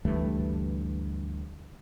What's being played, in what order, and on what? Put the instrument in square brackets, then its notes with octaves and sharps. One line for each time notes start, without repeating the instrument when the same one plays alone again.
[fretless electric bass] D2 G2 E3 A3